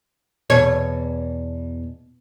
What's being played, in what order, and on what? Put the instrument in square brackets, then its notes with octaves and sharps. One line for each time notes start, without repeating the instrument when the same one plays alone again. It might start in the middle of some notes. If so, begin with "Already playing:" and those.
[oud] E2 B2 C#5